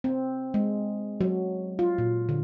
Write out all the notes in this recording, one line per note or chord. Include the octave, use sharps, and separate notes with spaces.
C4
G#3
F#3
F4
A#2
D3